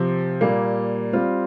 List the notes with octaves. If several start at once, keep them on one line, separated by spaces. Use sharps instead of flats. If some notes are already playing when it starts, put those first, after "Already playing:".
Already playing: C3 F3 C4
A#2 G3 A#3
G3 C4 F4